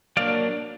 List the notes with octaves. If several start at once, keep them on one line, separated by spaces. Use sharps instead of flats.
F#3 A#3 D4 D5 F5